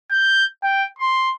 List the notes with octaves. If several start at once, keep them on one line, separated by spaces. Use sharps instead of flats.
G6
G5
C6